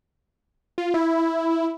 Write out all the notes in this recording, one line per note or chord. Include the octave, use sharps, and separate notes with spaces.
F4
E4